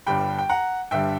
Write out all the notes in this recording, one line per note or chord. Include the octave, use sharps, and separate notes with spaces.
G1 G2 D3 G3 G5 B5
G5
F#5 A#5
G1 G2 D3 G3 E5 G5